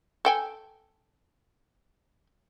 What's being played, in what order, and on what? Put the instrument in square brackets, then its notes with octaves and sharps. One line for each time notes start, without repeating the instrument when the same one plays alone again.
[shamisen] A4 G5 G#5